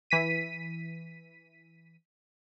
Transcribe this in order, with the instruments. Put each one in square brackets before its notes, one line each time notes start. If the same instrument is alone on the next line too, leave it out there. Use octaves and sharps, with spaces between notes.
[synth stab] E3 B6 D#7